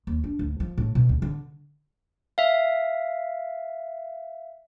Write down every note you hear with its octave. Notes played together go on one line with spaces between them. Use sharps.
D#2
D4
D2
F3
A2
B2
D2
D3
E5 F5